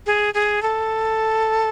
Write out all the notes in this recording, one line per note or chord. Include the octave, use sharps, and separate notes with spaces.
G#4
G#4
A4